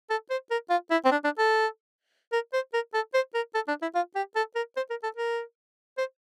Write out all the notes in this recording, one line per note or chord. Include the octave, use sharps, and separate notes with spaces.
A4
C5
A#4
F4
E4
C4
D4
D4
A4
A#4
C5
A#4
A4
C5
A#4
A4
D4
E4
F4
G4
A4
A#4
C5
A#4
A4
A#4
C5